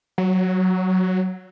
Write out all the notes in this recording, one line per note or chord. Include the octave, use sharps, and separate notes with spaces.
F#3